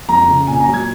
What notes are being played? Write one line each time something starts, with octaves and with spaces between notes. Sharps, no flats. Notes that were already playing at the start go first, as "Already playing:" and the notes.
F2 A#5
C#3
A#2 G#5
A#5
F#3
G#6